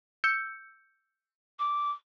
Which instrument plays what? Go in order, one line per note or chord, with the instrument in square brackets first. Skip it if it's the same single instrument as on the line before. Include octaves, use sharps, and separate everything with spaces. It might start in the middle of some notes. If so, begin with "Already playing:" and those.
[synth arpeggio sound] E6 G6 C#7
[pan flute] D6